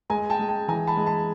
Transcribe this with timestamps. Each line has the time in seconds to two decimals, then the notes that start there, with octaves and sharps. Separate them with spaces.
0.10 G#3 G#5 A#5
0.30 G5 A5
0.39 G#3
0.49 G5 A5
0.68 E3 G#5 A#5
0.87 A5 B5
0.97 G#3
1.06 A5 B5